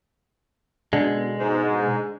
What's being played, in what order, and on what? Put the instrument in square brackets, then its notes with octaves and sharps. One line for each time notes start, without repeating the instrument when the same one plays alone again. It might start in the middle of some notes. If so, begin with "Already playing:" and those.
[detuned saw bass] B2 [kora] D3 [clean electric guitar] G#3
[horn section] G#2